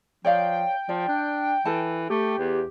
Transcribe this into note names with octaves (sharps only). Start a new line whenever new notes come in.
F3 C#5 D5 F5 G5
F3 D5
D4
E3 A4 A5
A3 G4
E2